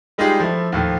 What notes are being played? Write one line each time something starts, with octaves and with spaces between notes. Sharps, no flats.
G3 G#3 D#4 F4 G4 G#4
F3 A3 E4
D#2 A2 F3